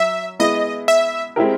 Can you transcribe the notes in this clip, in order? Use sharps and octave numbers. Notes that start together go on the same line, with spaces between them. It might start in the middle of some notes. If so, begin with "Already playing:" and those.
Already playing: F#3 E5
G#3 B3 E4 D#5
E5
G#3 C4 E4 G4 A#4